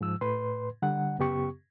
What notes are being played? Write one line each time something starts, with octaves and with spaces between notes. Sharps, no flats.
G#2 F3 E6
A2 B4 C6
D3 G3 F#5
F#2 C#3 B3 G4 C#6